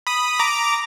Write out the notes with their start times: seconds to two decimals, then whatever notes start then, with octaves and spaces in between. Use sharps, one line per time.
0.07 B5 D#6
0.39 A#5 D6